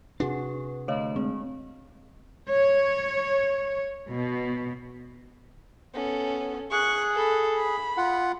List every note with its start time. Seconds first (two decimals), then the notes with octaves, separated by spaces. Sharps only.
0.20 C3 D4 F#4 G#4 B4
0.88 D2 C#5 D#5 F5
1.16 G#3 C4
2.49 C#5
4.09 B2
5.94 B3 C#4 A4
6.71 G#4 C#6 F#6
7.13 A4 B5
7.54 B5
7.97 F4 F#5